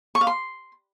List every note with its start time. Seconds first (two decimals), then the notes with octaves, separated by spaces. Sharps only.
0.15 C#6
0.21 F5
0.27 C6